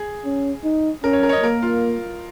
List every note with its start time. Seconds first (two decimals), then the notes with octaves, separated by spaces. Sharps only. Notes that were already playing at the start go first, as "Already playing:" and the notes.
Already playing: G#4
0.25 C#4
0.64 D#4
1.04 C#4 A#4
1.13 C#5
1.23 A#4
1.29 C#5
1.33 D#5
1.43 A#3 A#4
1.62 F4